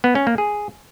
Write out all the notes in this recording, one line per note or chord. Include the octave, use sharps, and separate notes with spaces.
B3
C#4
A#3
G#4